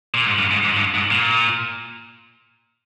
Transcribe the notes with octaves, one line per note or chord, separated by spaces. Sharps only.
A#2
G#2
G2
G#2
G#2
G2
G#2
A#2